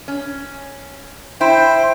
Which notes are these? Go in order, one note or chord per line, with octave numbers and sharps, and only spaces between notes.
C#4
E4 C5 G5